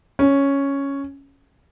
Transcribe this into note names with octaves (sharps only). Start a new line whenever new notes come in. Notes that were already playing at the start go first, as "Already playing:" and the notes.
C#4